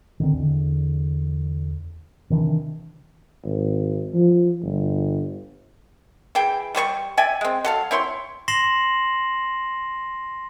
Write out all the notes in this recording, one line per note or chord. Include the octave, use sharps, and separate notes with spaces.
D3 D#3 C4
E2 D3
C3 D#3 E3 D4
G#1
F3
G1
E3 G#4 G5
G3 G4 C5 C#6
D5 E5 G5 G#5
G#3 C4
F#3 A4 F5
C4 E4 C#5 C6
C6 A#6 C7 E7 F#7